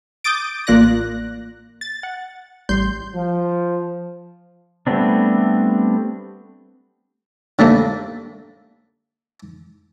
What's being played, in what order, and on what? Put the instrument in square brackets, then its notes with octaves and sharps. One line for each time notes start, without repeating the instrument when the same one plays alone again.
[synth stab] D6 D#6 G6 A6 D7
A1 A#3 F4 D5 F#6 A#6
A6
F#5
A1 G3 C6 G6
[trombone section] F3
[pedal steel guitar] G3 A3 B3 C4 D4
[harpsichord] D3 G3 A3 A#3